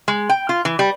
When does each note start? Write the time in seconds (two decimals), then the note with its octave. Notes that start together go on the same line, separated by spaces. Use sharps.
0.08 G#3
0.29 G5
0.49 F4
0.65 E3
0.79 G3